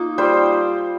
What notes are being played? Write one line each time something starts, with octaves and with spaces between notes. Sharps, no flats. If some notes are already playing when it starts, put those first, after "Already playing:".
Already playing: A#3 D#4 F4
G3 C5